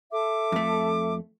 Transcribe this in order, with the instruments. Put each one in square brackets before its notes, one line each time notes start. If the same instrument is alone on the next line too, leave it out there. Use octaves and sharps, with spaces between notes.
[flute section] A4 E5 D6
[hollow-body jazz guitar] F2 A3